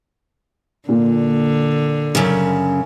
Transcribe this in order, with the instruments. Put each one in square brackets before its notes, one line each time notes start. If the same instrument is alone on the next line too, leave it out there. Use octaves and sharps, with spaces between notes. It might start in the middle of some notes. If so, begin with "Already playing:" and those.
[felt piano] A#2 [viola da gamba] D3
[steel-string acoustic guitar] F#2 C#3